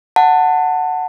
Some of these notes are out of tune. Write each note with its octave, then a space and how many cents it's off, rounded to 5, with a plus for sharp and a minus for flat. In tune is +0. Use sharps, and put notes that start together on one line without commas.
F#5 +0 A5 +15